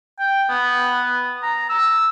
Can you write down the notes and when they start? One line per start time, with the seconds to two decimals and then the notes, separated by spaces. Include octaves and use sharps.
0.19 G5
0.50 B3
1.42 A#5
1.69 E6